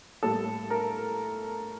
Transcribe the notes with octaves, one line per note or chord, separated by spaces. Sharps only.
A2 G3 A#3 A4
A#4